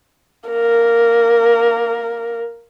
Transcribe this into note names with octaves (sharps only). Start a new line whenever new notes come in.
A#3 A#4